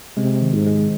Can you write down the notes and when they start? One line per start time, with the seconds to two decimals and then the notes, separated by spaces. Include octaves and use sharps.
0.17 C3 G#3
0.42 D#3
0.54 G#2
0.67 G#3